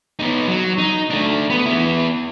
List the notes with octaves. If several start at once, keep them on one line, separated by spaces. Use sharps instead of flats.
B3 D#4
F#3
D#4
A3 D4
B3
B3 E4